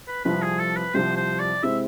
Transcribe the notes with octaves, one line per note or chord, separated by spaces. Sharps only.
B4
C2 C3 F3 B4
G#4
A4
B4
C2 C3 F3 C5
C5
D5
C3 G#3 C4 E4 E5